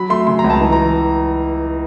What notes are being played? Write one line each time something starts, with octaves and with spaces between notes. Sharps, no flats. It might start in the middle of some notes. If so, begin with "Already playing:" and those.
Already playing: F#3 B5
A3 C6
C#3 C6
A#5
C#2
A5
E3
A#5